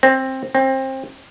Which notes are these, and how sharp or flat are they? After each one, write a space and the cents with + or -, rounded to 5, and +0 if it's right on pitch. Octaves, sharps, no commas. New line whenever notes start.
C4 +15
C4 +25